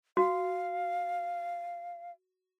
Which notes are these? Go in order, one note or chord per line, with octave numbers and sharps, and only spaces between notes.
F#4 F5